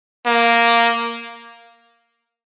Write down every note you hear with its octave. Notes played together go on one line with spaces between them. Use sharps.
A#3